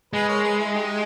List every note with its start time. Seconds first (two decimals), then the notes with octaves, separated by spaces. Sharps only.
0.13 G#3 G#4 B4
0.28 A#4 C#5
0.43 G#4 B4
0.58 E4 G#4
0.74 D#4 G4